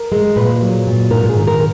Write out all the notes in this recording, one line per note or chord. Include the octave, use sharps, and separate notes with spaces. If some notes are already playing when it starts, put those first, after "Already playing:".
Already playing: A#4
G#3
A#2 B4
F#3
A#2
G#2 A#4
G#4
D#3
A#4